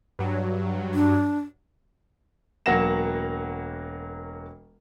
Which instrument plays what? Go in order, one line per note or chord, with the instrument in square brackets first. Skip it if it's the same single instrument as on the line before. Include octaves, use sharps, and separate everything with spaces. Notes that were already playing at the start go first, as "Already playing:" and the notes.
[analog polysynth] G2 F#3
[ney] D4
[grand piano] E1 F#3 A#3 F#5 A#6 E7